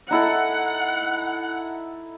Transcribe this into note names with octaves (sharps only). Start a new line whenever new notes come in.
D#4 E4 A4 F#5